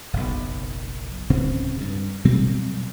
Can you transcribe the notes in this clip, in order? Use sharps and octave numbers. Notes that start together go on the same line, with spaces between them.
F#1 B1
D1 C#3 C4
G2
B2 F#3 G3 C4